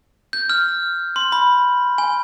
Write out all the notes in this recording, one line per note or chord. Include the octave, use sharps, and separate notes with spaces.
G6
F6
C6
B5
G#5